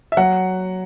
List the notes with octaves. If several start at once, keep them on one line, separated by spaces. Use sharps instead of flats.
E5
F#3 F#5